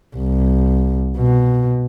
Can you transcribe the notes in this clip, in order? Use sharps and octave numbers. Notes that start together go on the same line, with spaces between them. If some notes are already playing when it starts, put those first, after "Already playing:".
C2
B2